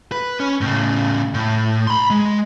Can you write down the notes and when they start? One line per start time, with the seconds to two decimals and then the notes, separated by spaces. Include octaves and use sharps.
0.12 B4
0.40 C#4
0.61 A2 C#3
1.34 A2
1.87 B5 C6
2.10 G#3